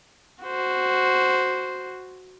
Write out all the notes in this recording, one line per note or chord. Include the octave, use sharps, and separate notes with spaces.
F#4 C5